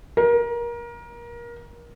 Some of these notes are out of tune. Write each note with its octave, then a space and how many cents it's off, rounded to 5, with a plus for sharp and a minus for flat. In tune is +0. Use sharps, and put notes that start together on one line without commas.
A#4 +25